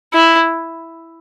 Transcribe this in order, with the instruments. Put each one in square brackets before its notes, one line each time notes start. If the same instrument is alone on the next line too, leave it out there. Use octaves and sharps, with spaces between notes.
[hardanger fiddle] E4